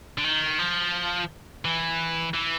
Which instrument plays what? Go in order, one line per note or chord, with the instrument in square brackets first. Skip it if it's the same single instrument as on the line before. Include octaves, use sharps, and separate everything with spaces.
[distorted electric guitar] D3
D#3
F3
E3
E3